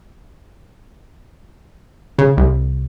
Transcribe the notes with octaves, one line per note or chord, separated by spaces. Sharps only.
C#3
C2